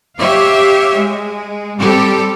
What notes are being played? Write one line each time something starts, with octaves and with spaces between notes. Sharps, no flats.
G4 C#5 E5 F5
G#3
G3 C4 G4 A4